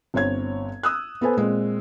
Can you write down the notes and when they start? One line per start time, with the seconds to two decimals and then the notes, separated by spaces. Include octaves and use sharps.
0.14 G1 C4 C#5 G#6
0.83 D#6 E6 F#6
1.21 B3 A4 B4 C5 G#5
1.37 A#2 G#3 C4